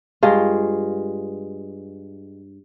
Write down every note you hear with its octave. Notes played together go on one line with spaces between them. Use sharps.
G2 G#3 F4